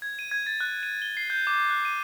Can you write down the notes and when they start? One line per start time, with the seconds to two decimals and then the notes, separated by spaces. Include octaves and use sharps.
0.02 G#6
0.19 D#7
0.31 G#6
0.46 A6
0.60 F#6
0.83 D#7
1.02 G7
1.17 C7
1.30 G6
1.47 D6
1.70 F#6
1.85 D#7